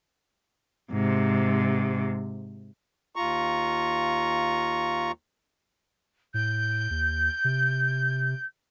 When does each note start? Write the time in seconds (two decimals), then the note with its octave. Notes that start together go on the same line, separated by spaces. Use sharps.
0.92 G#2 C3
3.16 D#2 F4 A#5 C#6
6.34 A2 G6
6.91 D#2
7.44 C3